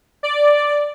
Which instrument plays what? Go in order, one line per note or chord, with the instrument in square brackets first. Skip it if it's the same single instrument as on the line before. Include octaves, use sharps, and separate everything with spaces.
[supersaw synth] D5